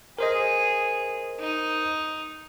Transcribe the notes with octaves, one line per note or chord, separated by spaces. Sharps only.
G#4 A#4 C5 D#5
D#4